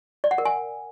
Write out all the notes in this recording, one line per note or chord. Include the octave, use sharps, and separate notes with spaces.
D5
F#5
A#4
G#5